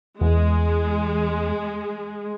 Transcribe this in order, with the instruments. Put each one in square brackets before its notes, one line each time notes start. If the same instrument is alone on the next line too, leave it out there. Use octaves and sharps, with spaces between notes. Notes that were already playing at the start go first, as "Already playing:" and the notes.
[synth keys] E2 [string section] G#3